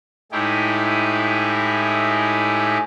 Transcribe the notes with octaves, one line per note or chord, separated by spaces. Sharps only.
A2 G#3 D#4 E4 G4 G#4